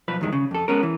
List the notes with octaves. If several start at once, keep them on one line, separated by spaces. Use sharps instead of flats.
B1 F3 B4
E2 G2 D#3 G#3
C#3
F2 A4
G#3 B3 C#4 A#4
E3